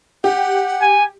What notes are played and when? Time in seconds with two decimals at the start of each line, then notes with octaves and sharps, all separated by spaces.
0.24 G4 F#5
0.81 G#5